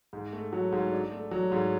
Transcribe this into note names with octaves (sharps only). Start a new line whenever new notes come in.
G#2
A3
F#3
G#2
D4
A3
F#3
G#2